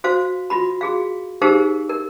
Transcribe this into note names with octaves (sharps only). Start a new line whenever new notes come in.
F#4 C5 F5
F4 F#4 B5
F#4 G#4 F5
D#4 G4 G#4 A#4 C5 F5
A#4